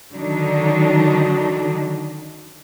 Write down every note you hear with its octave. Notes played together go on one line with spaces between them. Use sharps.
D3 D#3 F#3 D4 D#4